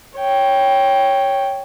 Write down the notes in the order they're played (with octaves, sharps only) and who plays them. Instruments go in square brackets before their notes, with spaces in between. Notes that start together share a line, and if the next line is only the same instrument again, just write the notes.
[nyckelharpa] C#5 G5